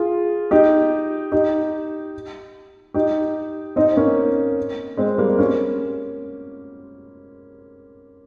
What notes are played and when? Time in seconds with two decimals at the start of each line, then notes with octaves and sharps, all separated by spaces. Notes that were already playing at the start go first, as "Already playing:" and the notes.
Already playing: F4 G#4
0.51 D#4 G4
1.32 D#4 G4
2.94 D#4 G4
3.76 C4 D#4
3.97 A#3 C#4
4.97 G#3 C4
5.18 G3 A#3
5.38 A#3 C#4